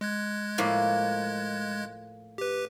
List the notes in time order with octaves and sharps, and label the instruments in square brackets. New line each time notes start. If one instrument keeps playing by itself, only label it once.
[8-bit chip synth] G#3 F#6 G#6
[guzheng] A2 F3 A#3
[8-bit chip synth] G4 B4